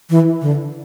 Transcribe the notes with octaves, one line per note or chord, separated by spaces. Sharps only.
E3
D3